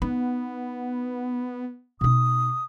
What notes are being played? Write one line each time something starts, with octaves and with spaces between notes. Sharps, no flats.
B3 D#4
B2 D#4 D#6